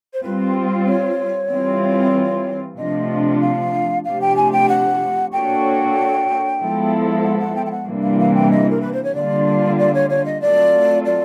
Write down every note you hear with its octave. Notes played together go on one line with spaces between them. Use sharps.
C5
G3 C4 F4 B4
C#5
E3 G3 C4 F4
C3 F3 A3 D4 F4 D#5
F5
C3 F3 A3 D4 G4 F5
G5
G#5
G5
F#5
A#3 D4 F#4 A4 C#5 G5
F3 G#3 B3 E4 A4
F#5
F#5
G5
G5
F#5
C3 E3 G3 A#3 D4
F5
F5
G5
D#5
A#4
B4
C5
C#5
D3 G3 A#3 D4 F4 D5
D5
C#5
C#5
D#5
F#3 A3 C4 F4 A4 D5
D5